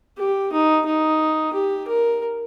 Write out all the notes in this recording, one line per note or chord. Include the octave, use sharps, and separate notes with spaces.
G4
D#4
D#4
G4
A#4